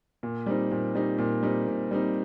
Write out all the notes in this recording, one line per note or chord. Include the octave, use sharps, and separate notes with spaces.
A#2
G3 C4 D#4
A#2
G3 C4 D#4
A#2
G3 C4 D#4
A#2
G3 C4 D#4